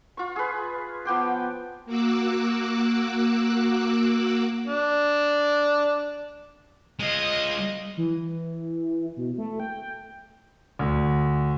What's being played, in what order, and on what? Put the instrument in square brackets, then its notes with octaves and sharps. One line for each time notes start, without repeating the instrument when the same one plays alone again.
[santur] F4 C#6
G#4 B4
F3 B3 G5 D6
[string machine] A#3 F#4 D6 E6 F#6
[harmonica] D4
[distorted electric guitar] G#3 F4 [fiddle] D#5
[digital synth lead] E3
B2
A3
G5
[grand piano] D2